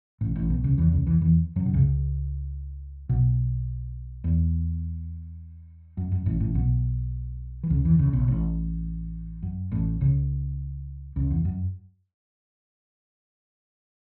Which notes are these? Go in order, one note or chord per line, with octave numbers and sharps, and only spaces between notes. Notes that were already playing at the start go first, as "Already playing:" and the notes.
A1 A2
A1 A2
B1 B2
C#2 C#3
E2 E3
C#2 C#3
E2 E3
E2 E3
F#2 F#3
B2
C#2 C#3
B1 B2
E2
F#2
F#2
A1 A2
A1 A2
B1 B2
E3
C#2 C#3
E2 E3
C#2 C#3
B1 B2
A1 A2
F#2
A1 A2
C#2 C#3
C#2 C#3
E2
F#2